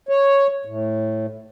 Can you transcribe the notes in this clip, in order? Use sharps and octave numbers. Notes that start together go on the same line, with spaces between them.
C#5
A2